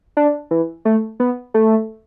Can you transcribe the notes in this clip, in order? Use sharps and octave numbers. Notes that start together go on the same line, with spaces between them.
D4
E3
A3
B3
A3